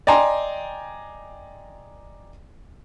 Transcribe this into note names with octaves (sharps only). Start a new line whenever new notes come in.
D5 D#5 G5 G#5 A#5 C6